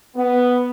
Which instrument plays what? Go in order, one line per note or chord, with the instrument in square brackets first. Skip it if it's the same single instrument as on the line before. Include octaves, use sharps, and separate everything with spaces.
[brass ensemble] B3